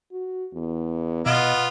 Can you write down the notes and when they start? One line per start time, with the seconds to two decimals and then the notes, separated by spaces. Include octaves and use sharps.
0.12 F#4
0.53 E2
1.26 B2 B3 F4 D#5